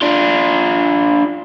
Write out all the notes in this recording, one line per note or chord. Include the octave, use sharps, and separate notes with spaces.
D4 F4